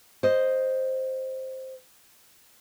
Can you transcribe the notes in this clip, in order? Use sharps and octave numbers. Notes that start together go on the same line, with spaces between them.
C5 D#5